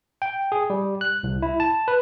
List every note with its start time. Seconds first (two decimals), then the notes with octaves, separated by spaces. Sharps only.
0.22 G5
0.52 G#4
0.70 G3
1.01 F#6
1.23 C2
1.42 E4
1.60 A5
1.88 B4